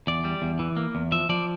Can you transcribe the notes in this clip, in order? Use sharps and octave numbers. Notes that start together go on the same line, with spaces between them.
E2 D5
G3
E2
E3
A#3
E2
F3 E5
F3 D5